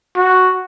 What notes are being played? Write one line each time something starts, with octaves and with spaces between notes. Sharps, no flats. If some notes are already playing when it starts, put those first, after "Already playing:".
F#4